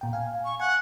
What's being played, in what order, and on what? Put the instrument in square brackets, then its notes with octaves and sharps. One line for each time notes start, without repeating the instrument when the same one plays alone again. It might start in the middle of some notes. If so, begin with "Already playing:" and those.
[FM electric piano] A#2 G5
F5 G#5
[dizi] C#6
[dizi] F#5 [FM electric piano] G#5 F#6